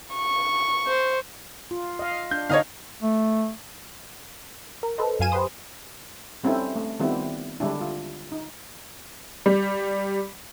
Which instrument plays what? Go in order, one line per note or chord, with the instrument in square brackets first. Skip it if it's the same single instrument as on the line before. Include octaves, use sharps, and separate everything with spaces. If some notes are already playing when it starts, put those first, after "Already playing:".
[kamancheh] C#6
[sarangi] C5
[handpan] F4
D#5 F5
[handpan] D4 [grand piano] G6
[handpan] D3 B3 D#4 [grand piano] C#5 D#5 F5
[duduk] A3
[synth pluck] A#4
A4 B4 C5 D#5
F#2 F#3 F5 G#5 D#7 E7
G4 B4 C5 C6 D#6
[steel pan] G3 C4 C#4 D#4 E4 A4
A3
D#3 G3 B3 C4 E4 F4
D3 G3 G#3 D4 E4
F4
D#4
[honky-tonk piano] G3